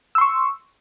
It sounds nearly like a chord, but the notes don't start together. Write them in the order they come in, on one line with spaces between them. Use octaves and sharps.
E6 C6 C#6